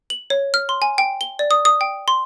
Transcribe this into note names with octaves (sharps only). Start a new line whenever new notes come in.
F#7
C#5
F6
C6
G#5
G5
G7
D5
D#6
D#6
G5
C6